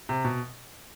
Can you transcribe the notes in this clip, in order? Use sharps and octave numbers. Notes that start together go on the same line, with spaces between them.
C3
B2